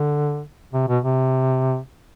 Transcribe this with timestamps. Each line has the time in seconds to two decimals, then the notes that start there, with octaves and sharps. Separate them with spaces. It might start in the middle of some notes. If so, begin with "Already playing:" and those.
Already playing: D3
0.74 C3
0.88 B2
1.04 C3